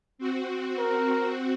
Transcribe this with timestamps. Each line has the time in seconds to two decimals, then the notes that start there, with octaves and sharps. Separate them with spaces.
0.18 C4 F#4
0.78 A#4